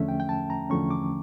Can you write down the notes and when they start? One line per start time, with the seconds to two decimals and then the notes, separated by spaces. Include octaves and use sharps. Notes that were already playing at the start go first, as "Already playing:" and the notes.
Already playing: E2 D3 F3 A3 C#4 E5
0.08 G5
0.20 G5
0.29 A5
0.50 A#5
0.70 E2 D3 F3 A3 C#4 C#6
0.91 D6